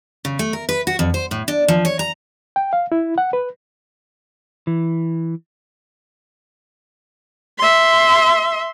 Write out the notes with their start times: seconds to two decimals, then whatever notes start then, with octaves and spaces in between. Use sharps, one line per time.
0.25 C#3
0.39 A3
0.53 A#4
0.69 B4
0.87 F#4
0.99 F2
1.14 C5
1.31 A2
1.48 D4
1.68 F3
1.85 C#5
1.99 A#5
2.56 G5
2.73 F5
2.92 E4
3.18 F#5
3.33 B4
4.67 E3
7.58 E5 C6